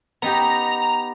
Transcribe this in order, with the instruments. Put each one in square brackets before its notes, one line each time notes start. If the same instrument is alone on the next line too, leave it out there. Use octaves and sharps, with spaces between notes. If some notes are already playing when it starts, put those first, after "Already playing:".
[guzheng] B3 D#4 G4 [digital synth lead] A#5